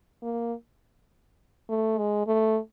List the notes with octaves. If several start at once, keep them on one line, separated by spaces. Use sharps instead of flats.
A#3
A3
G#3
A3